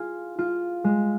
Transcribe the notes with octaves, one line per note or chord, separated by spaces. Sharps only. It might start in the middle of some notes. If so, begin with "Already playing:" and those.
Already playing: F4 G#4
F4
G#3